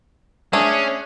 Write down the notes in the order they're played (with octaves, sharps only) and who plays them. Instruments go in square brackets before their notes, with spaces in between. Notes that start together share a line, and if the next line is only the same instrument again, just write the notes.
[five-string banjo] A3 D4 [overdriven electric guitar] C#4 [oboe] G#4